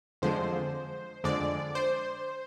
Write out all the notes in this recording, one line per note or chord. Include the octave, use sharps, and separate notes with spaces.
F2 D3 F3 G#3 C5
F2 D3 G#3 D5
C5